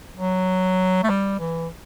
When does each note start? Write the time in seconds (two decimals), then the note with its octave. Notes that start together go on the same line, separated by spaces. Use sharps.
0.17 F#3
1.04 A3
1.10 G3
1.40 E3